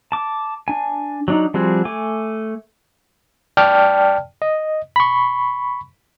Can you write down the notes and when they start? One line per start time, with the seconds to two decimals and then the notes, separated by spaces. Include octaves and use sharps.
0.12 A5 D6
0.68 D4 G#5
1.28 F#3 D4 D#4
1.54 F3 G3 C4 F#4 G#4
1.85 A3 G#5 D6
3.57 D5 G5 A5 F6
4.42 D#5
4.96 B5 C#6